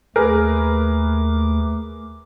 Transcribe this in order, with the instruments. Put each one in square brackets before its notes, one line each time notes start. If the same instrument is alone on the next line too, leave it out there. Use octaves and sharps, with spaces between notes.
[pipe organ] D#2 A3 D6 [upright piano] G#4 A#4 B4